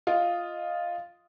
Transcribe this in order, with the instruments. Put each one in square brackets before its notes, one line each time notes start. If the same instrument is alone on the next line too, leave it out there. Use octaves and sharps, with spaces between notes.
[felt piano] F4 D#5